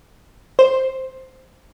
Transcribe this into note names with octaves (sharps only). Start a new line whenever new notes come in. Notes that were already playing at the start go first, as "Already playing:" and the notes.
C5